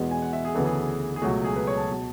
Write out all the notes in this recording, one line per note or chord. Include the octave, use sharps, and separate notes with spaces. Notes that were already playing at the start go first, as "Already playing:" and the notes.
Already playing: E2 B2 G#3 B3
G#5
F#5
E5
G#4
D2 C#3 E3 B3 A4
G#4
G#4
C#2 B2 F#3 A3 F#4
G#4
B4
C#5
A5
B2